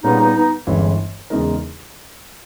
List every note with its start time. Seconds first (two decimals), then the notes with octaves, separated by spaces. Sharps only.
0.03 A#2 G3 B3 C#4 D#4 G#4
0.19 B3 D#4
0.36 B3 D#4
0.67 G1 G2 E3 G#3 C#4
1.30 E2 C#3 G#3 D#4 A#4